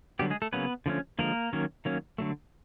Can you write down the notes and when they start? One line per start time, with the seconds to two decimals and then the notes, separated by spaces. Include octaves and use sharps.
0.19 D3 F#3 G3 B3 G4
0.30 G#3 G#4
0.42 A3 A4
0.53 C#3 F#3 A#3 B3 C#4 B4
0.86 D3 F3 A3 C#4
1.19 D3 F3 G#3 A#3 A#4
1.53 D#3 F#3 A#3 C#4
1.85 D#3 F#3 A#3 C#4
2.18 D3 F#3 A3